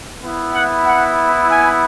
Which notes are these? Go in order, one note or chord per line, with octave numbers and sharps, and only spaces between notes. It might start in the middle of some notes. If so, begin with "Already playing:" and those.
B3 E4
F#5
F#5
G#5